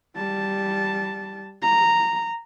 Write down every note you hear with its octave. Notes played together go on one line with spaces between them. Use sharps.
G3 A5
A#5